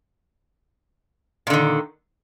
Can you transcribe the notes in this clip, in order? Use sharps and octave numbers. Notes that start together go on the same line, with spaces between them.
A#2 D3 D#3